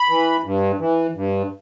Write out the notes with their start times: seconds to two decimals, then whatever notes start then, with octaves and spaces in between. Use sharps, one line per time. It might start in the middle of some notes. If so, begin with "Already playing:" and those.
Already playing: B5
0.09 E3
0.44 G2
0.79 E3
1.15 G2